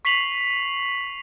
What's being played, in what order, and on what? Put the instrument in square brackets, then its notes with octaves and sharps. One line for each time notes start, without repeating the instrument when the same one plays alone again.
[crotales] C#6 B6 C7 F7 F#7